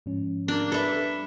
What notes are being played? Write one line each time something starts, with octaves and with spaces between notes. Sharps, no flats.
G#2 F3 C#4
A#3 D4
G3 A4 B4 E5